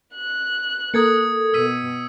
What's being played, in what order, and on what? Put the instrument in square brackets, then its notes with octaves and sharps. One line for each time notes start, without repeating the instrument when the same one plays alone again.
[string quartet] F#6
[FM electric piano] A#3 A4 A#4 [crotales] D#6 G#6 C#7
[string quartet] B2 [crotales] E6 B6 D#7